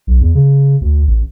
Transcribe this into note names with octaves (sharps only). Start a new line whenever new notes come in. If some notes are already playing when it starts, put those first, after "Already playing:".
B1
E2
C#3
D2
A1